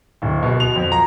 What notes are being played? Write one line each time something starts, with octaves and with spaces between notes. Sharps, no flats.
D1
B2
F7
F2
A#5